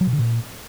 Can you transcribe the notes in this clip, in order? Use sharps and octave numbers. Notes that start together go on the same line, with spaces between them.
F#3
B2
D3
A#2